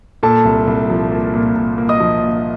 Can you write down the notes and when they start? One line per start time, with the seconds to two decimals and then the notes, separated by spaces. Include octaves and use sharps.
0.23 A#2 A4 A5
0.45 C2
0.67 C2
0.90 F3
1.12 A#3
1.34 A#2
1.56 A#2
1.78 A#3
1.89 D#5 D#6
2.00 F3
2.22 A#2